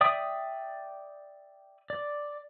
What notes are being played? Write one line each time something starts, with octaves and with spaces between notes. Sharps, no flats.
D5 E5 G5 D#6
D5